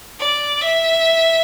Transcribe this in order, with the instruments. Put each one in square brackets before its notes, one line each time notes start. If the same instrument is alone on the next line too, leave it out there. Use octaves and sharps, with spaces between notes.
[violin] D5
E5